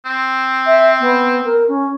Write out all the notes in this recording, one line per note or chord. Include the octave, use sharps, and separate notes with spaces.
C4
E5
B3
A#4
C#4